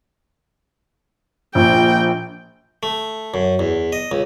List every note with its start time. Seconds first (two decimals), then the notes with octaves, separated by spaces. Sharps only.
1.55 A#1 G5
2.83 A3
3.34 F#2
3.59 E2
3.93 D#5
4.11 C#2